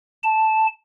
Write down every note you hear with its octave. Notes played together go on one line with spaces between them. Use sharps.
A5